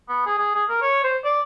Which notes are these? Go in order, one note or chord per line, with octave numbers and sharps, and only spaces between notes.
B3
G#4
G#4
G#4
A#4
C#5
C5
D5